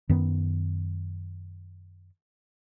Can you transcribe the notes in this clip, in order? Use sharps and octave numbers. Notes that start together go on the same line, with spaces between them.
F#2 D#3 B3